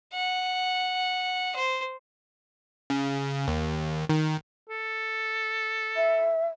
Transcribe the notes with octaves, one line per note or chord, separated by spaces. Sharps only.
F#5
C5
C#3
D#2
D#3
A4
E5